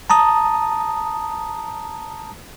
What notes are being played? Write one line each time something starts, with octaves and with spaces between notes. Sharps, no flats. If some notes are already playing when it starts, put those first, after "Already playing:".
A5 A#5 D#6